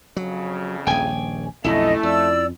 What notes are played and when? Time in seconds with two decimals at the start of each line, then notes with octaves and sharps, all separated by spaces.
0.17 F2 C#3 F#3
0.87 D#1 A#1 G5 G#5
1.64 B1 F2 D3 A3 C#4 E4 D#5
2.03 F2 D5 E6